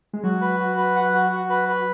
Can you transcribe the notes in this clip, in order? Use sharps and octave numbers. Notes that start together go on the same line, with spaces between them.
G#3
F#3 F#4
B4
F#4
B4
F#5
F#4
F#4
B4
B4